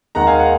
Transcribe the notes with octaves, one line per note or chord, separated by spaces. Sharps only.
D#2 D#3 G#3 F#5 A#5
F5 G#5
F#5